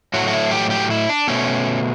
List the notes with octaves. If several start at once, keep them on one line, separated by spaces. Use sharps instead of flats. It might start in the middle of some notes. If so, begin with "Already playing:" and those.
A2 F#3 A3 F#4
F#4
E4
G4
G4
E4
D4
B2 A3 C#4